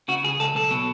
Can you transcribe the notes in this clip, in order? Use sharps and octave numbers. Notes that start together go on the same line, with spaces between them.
C#3 F#4
C#2 G#4
C#2 A4
B1 A4
B2